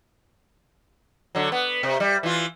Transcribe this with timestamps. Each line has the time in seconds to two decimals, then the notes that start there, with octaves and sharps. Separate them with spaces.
1.35 D3 F#3
1.52 B3
1.83 C3
2.00 G3
2.23 E3 F4